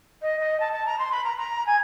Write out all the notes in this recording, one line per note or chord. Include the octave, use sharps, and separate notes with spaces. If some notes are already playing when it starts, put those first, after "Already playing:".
D#5
D#5
A5
A5
A#5
C6
B5
A#5
A#5
G#5